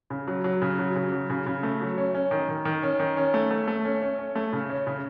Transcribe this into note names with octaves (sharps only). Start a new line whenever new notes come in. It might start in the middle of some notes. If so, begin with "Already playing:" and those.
C#3
F#3
F#3
C#3
F#3
C#3
F#3
C#3
C#3
A3
F#3
C#4
C#4
D#3
D#3
D#3
C#4
D#3
C#4
A3
A3
A3
C#4
C#4
C#4
A3
C#3
C#4
C#3